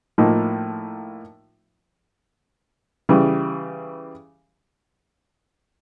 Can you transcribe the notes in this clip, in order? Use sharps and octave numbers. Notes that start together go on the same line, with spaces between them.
A2 F3 A#3 D#4
C#3 E3 G3